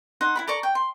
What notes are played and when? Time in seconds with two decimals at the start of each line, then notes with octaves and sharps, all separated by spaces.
0.21 D#4 F#5 C6
0.36 E4 F#4 B5
0.48 A4 D5 A#5 C#6
0.63 G5
0.75 C6